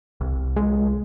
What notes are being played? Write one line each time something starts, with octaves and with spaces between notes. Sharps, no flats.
C2
G#3